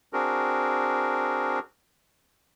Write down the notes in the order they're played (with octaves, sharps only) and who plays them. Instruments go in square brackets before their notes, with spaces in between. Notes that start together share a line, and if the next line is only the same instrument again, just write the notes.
[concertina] C4 D4 F#4 G#4 A#4